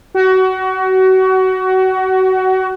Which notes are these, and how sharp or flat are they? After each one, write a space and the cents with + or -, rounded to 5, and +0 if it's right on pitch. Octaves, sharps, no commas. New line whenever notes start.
F#4 +25